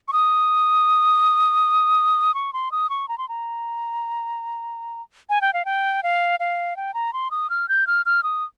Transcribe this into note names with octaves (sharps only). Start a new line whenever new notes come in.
C#6
D#6
C#6
C6
D#6
C#6
A#5
C6
A#5
G#5
G5
F5
G5
F5
F5
G5
A#5
C6
D#6
F6
G6
F6
F6
D#6